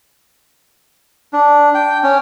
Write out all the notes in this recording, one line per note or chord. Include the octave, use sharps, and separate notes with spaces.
D4
G5
C#4